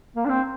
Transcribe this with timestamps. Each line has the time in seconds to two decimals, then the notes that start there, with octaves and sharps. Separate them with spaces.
0.16 A#3
0.25 D4
0.29 C4